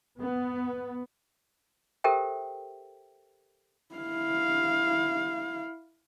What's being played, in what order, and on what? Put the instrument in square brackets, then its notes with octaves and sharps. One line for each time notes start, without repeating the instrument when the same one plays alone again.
[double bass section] B3
[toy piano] G4 A4 A#4 C5 E5 G5
[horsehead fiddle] E4 F5